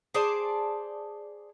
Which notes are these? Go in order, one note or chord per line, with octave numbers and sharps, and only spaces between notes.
G#4 C5 D5 A5